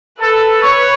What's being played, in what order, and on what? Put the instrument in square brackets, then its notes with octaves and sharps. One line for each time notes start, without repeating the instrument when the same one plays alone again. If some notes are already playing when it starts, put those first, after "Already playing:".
[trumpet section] A4 [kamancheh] B4
[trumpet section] C#5